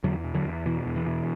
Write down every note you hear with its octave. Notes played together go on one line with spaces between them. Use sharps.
E2 D3 F#3
B2
D3 F#3
E2
B2 E3
E2
E3
B2